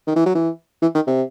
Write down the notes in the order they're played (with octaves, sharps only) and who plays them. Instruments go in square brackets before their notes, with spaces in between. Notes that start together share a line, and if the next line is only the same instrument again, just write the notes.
[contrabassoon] D#3
E3
F#3
E3
E3
D#3
C3